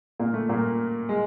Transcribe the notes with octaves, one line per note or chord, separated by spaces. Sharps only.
A#2 A#3
A3
A#2 A#3
G#3